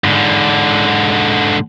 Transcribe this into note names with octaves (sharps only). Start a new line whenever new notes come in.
G#2 D3